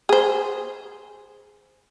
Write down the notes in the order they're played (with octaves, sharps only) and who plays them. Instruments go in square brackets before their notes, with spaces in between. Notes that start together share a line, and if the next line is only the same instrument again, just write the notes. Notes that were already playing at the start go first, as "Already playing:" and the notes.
[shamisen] G#4 C5